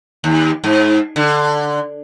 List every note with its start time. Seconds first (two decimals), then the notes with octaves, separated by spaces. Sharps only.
0.24 D#2
0.64 G#2
1.16 D3